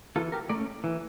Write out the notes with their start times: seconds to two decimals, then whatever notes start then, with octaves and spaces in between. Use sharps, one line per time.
0.16 E3 F4 A4
0.32 G4 A#4
0.49 A3 A#4 D5
0.54 C#4
0.84 E3